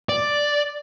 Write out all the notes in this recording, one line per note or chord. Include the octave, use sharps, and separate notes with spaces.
D5